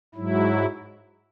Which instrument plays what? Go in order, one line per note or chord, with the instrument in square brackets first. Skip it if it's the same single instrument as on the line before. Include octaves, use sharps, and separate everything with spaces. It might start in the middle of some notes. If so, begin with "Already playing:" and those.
[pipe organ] G#2 F#3 E4